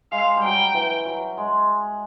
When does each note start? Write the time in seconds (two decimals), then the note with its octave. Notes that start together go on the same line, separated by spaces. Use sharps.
0.12 G#3 F5
0.37 G3
0.43 F#3 G5
0.74 E3
1.05 F#3
1.38 G#3